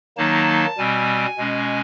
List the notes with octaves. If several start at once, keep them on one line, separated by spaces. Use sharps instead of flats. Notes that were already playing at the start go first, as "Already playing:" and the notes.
D#3 F#3 A#3 D#4 A5
B2 G3 C4 G#5
B2 G#3 C#4